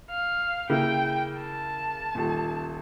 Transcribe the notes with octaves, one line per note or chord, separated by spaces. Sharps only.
F5
C#3 A#3 E4 G5
A5
D#1 A#2